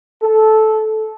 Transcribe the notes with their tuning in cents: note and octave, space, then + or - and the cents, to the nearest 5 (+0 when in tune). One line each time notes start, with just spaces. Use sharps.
A4 -15